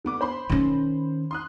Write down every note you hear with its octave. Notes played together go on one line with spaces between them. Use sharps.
D3 B3 D6
C5 B5 C6
D#3 C#4
C6 D#6 F#6